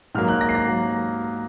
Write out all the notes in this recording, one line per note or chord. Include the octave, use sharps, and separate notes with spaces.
G#2 F#3 A#3 F6
F#6
A#6
C7
A#6
F#3 A#3